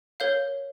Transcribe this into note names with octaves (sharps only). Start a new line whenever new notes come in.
A#4 C#5 F5 G6